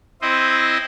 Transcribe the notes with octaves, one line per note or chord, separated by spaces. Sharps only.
C4 E4 C5 D#5